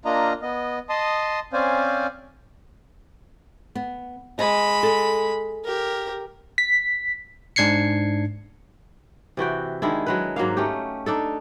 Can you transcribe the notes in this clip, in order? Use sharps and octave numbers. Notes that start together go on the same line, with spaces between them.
A#3 D4 F4 D#5 A#5
B3 D#5
D#5 A5 C6 D#6
C4 C#4 C5 D5 F5 G#5
B3
G#3 D#5 B5
A4
G4 A#4
B6
G#2 D4 G#6 C7 C#7
C3 E3 F#4 G5
D#3 G#3 D4 E4
F#3 G#3 B4
G#2 F#3 A#3 F5
A3 C#4 D#4 G4
D4 D#4 A4